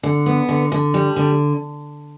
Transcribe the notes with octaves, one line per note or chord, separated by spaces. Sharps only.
D3
B3
D3
D3
G3
D3